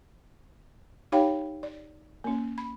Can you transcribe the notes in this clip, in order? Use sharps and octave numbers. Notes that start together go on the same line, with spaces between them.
D#4 G4 C#5 F5 G5 B5
D5
A#3 C#4
B5